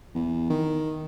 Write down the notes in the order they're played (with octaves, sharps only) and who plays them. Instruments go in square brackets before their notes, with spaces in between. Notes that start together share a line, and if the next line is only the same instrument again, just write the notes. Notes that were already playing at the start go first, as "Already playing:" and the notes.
[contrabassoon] E2
D#3